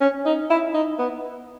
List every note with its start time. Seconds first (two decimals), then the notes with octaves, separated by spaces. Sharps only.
0.01 C#4
0.26 D#4
0.50 E4
0.74 D#4
0.99 B3